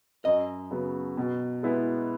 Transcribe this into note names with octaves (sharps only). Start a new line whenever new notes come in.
F#2 D#5
C#3 F#3 B3
B2
G#3 B3 E4